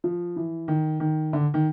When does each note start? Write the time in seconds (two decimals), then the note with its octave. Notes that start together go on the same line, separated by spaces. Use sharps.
0.04 F3
0.36 E3
0.68 D#3
1.00 D#3
1.33 D3
1.54 D#3